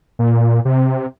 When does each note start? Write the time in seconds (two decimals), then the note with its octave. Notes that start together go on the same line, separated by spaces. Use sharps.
0.19 A#2
0.65 C3